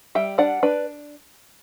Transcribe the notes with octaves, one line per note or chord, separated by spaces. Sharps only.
G3 E5 G5
D4 D5 F#5
D4 B4 D5